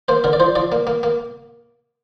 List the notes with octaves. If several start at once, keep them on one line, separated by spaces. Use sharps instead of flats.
A#3 C5
D3 A#4
D5
F3 C5
F3 D5
A#3
A#3
A#3